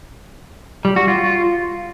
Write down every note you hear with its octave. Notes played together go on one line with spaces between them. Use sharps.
G3
F#4
F4